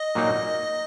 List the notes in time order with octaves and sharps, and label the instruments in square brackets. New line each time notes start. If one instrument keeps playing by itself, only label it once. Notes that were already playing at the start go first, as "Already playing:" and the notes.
Already playing: [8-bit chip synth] D#5
[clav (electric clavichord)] A#2 F#3 A#3 D#4